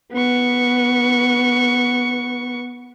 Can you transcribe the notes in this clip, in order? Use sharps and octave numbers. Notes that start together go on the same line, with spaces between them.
B3 C#6